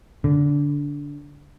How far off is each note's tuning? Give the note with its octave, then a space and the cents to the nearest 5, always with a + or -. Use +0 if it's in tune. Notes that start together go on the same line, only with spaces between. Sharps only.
D3 -20